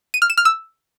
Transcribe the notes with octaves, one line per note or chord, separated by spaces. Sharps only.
D#7
F6
E7
F6
E6